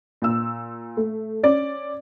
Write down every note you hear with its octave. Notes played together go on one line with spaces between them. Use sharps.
A#2 E6
A3
C#4 D5